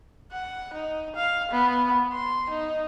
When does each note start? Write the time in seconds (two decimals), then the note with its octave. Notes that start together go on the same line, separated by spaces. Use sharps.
0.32 F#5
0.73 D#4
1.16 F5
1.51 B3
2.12 C6
2.50 D#4